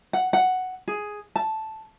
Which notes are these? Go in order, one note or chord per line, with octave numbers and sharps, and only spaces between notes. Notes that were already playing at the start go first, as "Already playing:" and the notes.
F#5
F#5
G#4
A5